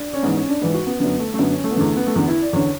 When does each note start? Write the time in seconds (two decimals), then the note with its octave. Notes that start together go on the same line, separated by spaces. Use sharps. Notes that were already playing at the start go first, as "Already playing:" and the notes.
Already playing: D4
0.13 C#4
0.23 G#2 E3 B3
0.37 C#4
0.49 D4
0.61 G#2 E3 B4
0.74 F#4
0.87 B3
1.00 F#2 D3 B3
1.19 A3
1.34 A3
1.38 F#2 D3 B3
1.52 C#4
1.64 A3
1.71 B3
1.76 E2 D3 A3
1.96 B3
2.07 A3
2.15 E2 D3 B3
2.28 E4
2.40 D5
2.53 E2 D3 C#5